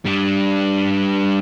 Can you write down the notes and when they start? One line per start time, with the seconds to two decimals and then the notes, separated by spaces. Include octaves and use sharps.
0.06 G3 D4